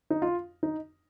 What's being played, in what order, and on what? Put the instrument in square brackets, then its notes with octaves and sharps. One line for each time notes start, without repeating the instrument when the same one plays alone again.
[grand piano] D#4
F4
D#4